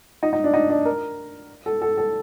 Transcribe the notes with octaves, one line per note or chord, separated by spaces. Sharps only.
D#4
D#4
D4
D#4
D4
A#4
A4
A4
A4